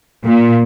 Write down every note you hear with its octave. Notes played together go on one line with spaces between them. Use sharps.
A#2